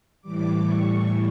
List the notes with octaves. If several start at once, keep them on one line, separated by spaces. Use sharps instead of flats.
A2 E3 G3 D6
C#6